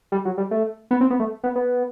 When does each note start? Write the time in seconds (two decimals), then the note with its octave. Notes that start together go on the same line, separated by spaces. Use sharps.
0.12 G3
0.25 F#3
0.38 G3
0.51 A3
0.91 B3
1.01 C4
1.10 B3
1.20 A3
1.44 B3
1.56 B3